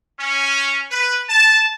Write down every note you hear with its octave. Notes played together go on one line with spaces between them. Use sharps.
C#4
B4
A5